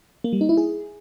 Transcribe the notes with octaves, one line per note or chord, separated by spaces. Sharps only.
A#3
G3
D#4
E4
G#4